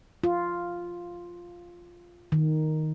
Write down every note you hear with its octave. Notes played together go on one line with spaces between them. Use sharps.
F4
D#3